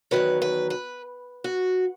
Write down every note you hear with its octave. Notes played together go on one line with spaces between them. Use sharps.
E2 C3 D#3 F#3 B4
B4
B4
F#4